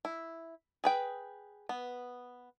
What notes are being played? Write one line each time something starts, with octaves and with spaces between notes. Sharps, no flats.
E4
G#4 B4 G5
B3